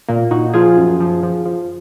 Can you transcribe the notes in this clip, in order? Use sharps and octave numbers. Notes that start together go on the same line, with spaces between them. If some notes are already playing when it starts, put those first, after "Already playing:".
A#2 A#3
A#2 D#4 F#4
F3 F4 G#4
F#2
F3
F3
F3